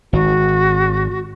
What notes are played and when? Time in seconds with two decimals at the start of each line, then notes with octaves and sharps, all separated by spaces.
0.13 G#1 F#4